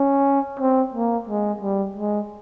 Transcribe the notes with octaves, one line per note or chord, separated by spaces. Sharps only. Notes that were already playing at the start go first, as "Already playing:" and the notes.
Already playing: C#4
C4
A#3
G#3
G3
G#3